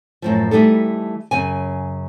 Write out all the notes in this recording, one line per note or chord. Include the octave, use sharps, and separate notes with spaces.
F#2 A2 F3
E3 G3 A3 D#4 A4
F#2 C#3 G#5